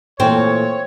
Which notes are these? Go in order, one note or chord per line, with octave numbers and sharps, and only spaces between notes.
A#2 E3 A3 C4 C#5 G5 A5